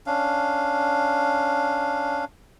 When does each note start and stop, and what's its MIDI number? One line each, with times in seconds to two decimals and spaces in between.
0.07 2.25 61
0.07 2.25 62
0.07 2.25 77